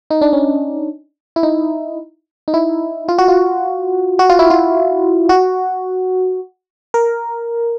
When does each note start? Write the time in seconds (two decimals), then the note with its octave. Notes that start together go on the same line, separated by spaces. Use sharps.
0.11 D#4
0.21 D4
0.33 C#4
1.36 E4
1.43 D#4
2.48 D#4
2.54 E4
3.09 F4
3.18 F#4
3.28 F4
4.19 F#4
4.30 F4
4.39 E4
4.50 F4
5.29 F#4
6.94 A#4